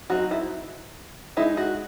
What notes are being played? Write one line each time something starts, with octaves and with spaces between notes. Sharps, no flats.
F#3 C4 D#4 F#4
E4
G#3 D#4 E4
F#4